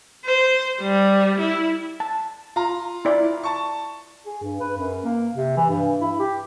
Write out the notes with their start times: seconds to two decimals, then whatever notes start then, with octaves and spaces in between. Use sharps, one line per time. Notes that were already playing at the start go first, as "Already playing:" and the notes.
0.25 C5
0.81 G3
1.39 E4
2.00 A5
2.56 F4 A#5
3.05 E4 D5
3.44 A5 C#6
4.26 G#4
4.42 G2
4.60 B4
4.77 F#2
5.04 A#3
5.34 C3
5.57 E3
5.69 G2
6.00 E4
6.19 G4